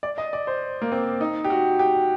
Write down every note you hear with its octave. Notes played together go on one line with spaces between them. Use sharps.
D5
D#5
D5
C5
A#3
C4
D#4
G4
F#4
G4